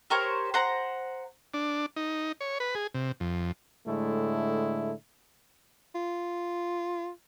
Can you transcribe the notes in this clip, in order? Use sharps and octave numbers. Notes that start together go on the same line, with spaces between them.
G4 A#4 C5 C#5
C5 F#5 A#5
D4
D#4
C#5
B4
G#4
C3
F2
A2 D3 G#3 A3 E4
F4